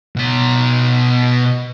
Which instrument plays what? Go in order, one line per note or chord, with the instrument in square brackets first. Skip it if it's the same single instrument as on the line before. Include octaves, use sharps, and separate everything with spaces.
[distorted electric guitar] B2 A#5